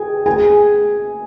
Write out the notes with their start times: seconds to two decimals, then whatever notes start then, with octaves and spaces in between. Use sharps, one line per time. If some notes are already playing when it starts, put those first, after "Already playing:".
Already playing: G#4 G5 G#5
0.26 G#4 G#5